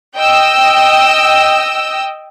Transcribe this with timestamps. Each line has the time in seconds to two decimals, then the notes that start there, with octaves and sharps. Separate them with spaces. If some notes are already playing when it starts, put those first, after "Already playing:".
0.18 D#5 G5 E6